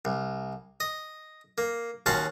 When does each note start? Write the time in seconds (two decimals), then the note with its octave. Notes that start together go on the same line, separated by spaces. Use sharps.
0.05 C2
0.80 D#5
1.58 A#3
2.06 D#2 C#4 F#4 F5 A5 C6